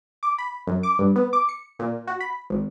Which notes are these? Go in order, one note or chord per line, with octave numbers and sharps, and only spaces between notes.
D6
B5
F#2
D6
G2
B3
D6
C#7
A#2
F#4
B5
G#1